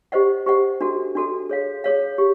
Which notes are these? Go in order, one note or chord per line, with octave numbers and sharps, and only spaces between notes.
G4 C5 D#5 F#5
G4 C5 D#5 F#5
D4 F#4 A4
D4 F#4 A4
G#4 C#5 F5
G#4 C#5 F5
G4